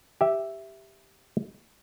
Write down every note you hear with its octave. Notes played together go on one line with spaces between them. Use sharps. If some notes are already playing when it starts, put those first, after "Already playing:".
G4 E5